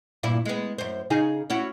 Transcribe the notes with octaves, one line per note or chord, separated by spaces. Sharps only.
G2 A#2 E4
G#3 B3
F#2 C5
C#3 D#4 G#4
C#4 E4 F#4